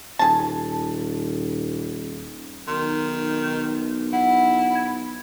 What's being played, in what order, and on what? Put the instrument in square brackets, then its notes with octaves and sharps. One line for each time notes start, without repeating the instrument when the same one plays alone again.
[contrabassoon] D#1 [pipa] G#4 A5
[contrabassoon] B1 [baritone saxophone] D#3 [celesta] C6
[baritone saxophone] E4 [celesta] F#5
[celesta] G#6